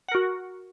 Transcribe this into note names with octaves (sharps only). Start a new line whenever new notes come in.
F#4 A#4 F#5